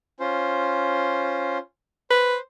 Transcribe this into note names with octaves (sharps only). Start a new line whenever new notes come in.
C#4 F4 C5
B4 C5